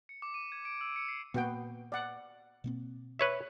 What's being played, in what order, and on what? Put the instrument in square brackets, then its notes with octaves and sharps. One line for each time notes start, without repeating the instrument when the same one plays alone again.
[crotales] C#7
D6
D#7
G#6
D7
E6
C#7
C7
[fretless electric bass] A#2 A#3 [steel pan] B3 F#4 G5
[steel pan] D5 F#5
[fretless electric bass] B2 A#3 C4
[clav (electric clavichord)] B4 C#5 E5